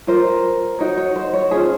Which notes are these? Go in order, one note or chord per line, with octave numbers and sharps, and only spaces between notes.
F4 A#4 C5
D#4 F#4 A#4 C#5
C#5
C5
C#5
C#4 F4 G#4 C5